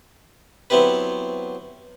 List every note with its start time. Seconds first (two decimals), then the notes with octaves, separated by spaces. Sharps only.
0.70 F#3 B3 C4 E4 G4 B4